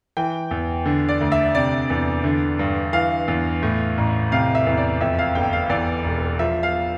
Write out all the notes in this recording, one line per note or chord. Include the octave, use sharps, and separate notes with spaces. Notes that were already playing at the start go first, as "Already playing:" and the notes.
E3 G5
E2
D3
D5
D2
E5
C3 D5
E2
D3
G2
E3 F5
E2
A2
A1
C3 F5
E5
E2
D5
F2 E5
F5
G1 G5
F5
E2 D5
E1
F3 E5
F5